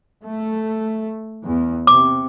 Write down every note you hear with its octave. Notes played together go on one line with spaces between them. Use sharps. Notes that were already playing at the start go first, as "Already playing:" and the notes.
A3
E2
C3 D6